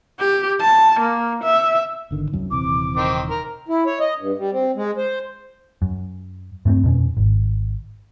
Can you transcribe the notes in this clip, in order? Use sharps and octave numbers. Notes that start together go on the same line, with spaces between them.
G4
A5
A#3
E5
G1 D3 D#3
C2 F#2
D#1 C3 E3 D6
D#3 C4
A#4
E4
C#5
D#5
G2
G3
C4
G#3
C5
F#2
G2 A3 B3 C4
F2 B2 C#4
G#1